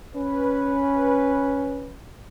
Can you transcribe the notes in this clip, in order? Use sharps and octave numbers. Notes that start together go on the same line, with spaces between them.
C#4 B4